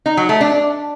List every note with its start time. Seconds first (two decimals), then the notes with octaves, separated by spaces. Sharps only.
0.06 D#4
0.17 F#3
0.29 A3
0.41 D4